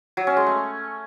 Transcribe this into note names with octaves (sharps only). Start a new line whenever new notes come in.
F#3
C#4
G#3
A3